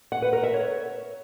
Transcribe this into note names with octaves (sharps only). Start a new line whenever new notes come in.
F#5
B4
A#4
E5
C#5